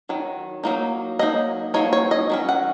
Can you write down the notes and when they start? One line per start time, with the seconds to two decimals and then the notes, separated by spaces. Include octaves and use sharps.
0.09 D#3 F#3
0.63 F#3 A#3 D#4
1.19 F#3 A#3 D#4 D#5
1.74 F#3 A#3 D#4 C#5
1.93 C#5
2.11 D#5
2.30 D#3 F#3 C#4
2.49 F#5